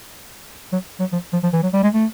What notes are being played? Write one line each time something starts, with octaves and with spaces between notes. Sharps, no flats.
F#3
F#3
F3
F3
F3
E3
F#3
G3
G#3
A3